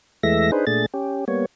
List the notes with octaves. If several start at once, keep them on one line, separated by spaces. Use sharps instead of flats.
E2 E3 G#3 A3 E5 A#6
D4 D#4 G#4 B4 C5
A#2 A3 D4 G#4 A6
C#4 G4
G3 A#3 B3 C#5